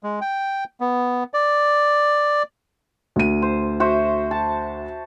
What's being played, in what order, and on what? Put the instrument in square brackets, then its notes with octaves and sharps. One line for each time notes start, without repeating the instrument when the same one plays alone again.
[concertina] G#3
G5
B3
D5
[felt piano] D2 D#7
[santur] C5
F#4 C5 E5
A5